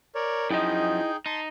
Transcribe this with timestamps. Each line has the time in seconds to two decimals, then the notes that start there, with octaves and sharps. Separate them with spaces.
0.15 A#4 C#5 D5
0.50 F#2 F3 D#4 E4 G#4 D#5 G5
1.26 D#4 A5 C6